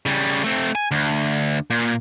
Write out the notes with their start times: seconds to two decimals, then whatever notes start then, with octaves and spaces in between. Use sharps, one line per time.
0.06 C#3 G3
0.44 A3 C4
0.75 G#5
0.91 D2
1.70 A#2